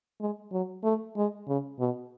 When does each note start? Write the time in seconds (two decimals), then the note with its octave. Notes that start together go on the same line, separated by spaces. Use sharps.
0.21 G#3
0.52 F#3
0.83 A3
1.16 G#3
1.48 C#3
1.79 B2